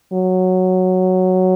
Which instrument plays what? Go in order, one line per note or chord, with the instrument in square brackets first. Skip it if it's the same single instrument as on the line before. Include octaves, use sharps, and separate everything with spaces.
[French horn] F#3